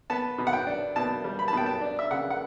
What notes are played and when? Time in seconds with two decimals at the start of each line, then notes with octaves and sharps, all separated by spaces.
0.10 B3 A5
0.38 B2
0.47 F#5
0.53 G5
0.67 D4
0.96 B2 A5
1.24 G3
1.39 B5
1.48 A5
1.53 B2 G5
1.66 A5
1.81 D4
1.99 E5
2.11 C#3 F#5
2.30 F#5